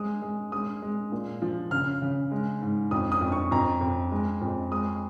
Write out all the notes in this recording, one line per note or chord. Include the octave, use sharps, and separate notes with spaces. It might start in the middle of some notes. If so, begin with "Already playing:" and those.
Already playing: G#3 D#6
G#3
G#3 D#6
G#3
A#2
F3
C#3 F6
C#3
G#3
G#2
F2 D#6
D#6
F2
C#6
F2 A#5
F2
G#3
F2
G#3 D#6